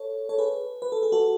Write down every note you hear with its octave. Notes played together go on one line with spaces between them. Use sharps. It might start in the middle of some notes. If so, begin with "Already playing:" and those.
Already playing: A4 C#5
A4 C#5
G#4 B4
B4
A4
G#4
F#4 A4